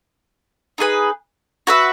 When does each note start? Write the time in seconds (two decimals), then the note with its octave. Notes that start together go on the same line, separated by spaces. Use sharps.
0.78 D#4 G#4 B4
1.67 F#4 B4 E5